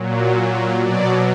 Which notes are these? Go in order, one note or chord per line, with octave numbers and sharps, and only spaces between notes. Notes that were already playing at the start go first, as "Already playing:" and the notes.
Already playing: A#2 F#3
B2 F#3 D5